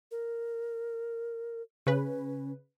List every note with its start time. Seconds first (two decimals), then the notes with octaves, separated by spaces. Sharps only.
0.11 A#4
1.87 C#3 C#4 B4